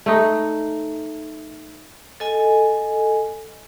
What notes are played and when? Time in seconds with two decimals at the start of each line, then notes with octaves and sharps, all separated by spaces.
0.06 A3 D#4
2.20 A4 D#5 G#5